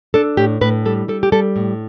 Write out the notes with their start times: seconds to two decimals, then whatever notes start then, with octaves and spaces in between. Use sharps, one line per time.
0.14 D4 A4
0.37 A2 G4
0.61 A2 B4
0.85 G3 A4
1.08 G3 A4
1.23 G4
1.32 G3 A4
1.56 A2